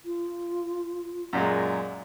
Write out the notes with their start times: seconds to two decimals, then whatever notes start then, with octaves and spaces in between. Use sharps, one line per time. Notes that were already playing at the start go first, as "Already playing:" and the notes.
0.05 F4
1.33 F#2 A#2 G#3